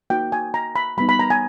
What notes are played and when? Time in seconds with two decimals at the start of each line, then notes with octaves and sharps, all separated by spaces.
0.10 A#3 D#4 F#4 G5
0.32 G#5
0.54 A#5
0.76 B5
0.97 G3 B3 D#4 B5
1.09 B5
1.19 A#5
1.30 G#5